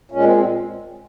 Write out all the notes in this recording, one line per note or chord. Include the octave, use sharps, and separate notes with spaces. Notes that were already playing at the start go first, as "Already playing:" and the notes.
A#2 G#3 C#4
C4
C4